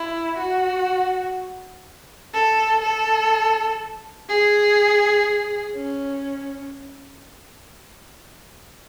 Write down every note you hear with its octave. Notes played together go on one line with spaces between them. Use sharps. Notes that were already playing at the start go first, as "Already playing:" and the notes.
Already playing: E4
F#4
A4
A4
G#4
C#4